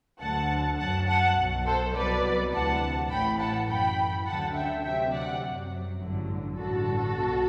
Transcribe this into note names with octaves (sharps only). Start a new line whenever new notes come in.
D2 D3 F#3 F#5 A5
F#2 F#3 F#5 A5
F#5 A5
B1 B2 F#3
A4 C5
C2 B2 F#3 B4 D5
D2 C3 E3 F#5 A5
A1 A2 E3 G5 B5
F#5 A5
F#2 E3 G5 B5
D2 D3 F#3 F#5 A5
E5 G5
D2 C3 F#3 E5 G5
D5 F#5
F#2 F#3
A1 G2 D3 F#3
A1 G2 D3 F#4 A4
B1 B2